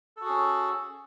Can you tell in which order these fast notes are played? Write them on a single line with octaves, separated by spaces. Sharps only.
A4 F#4 G#4 C#4